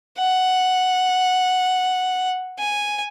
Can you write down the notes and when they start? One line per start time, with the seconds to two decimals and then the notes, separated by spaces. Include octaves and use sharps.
0.18 F#5
2.59 G#5